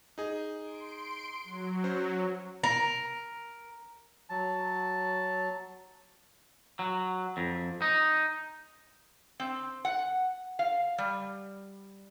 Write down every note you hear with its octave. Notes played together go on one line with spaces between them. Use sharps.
D#4 G#4
C6 D7
F#3
C#4 C5
A#4
F#3 A5
F#3
F2
D#4
C4
F#5
F5
G3